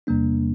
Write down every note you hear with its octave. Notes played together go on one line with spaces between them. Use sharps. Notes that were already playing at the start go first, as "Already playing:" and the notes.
E2 C3 G3 A#3 D4